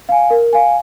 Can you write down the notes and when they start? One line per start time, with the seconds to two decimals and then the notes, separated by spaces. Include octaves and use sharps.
0.09 F5 G#5
0.30 A#4
0.53 F5 G#5